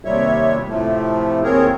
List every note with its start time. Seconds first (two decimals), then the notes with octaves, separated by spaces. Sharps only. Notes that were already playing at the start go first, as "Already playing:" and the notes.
0.05 D#2 C3 G3 C#5 E5
0.68 A2 C3 F3 A3
1.44 D#2 C4 G#4 A#4 C#5